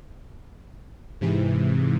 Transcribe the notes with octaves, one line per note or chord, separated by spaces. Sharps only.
G#2 C3 E3